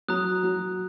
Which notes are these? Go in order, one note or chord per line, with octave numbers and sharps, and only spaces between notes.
F#3 A#5 D#6 F#6
F#3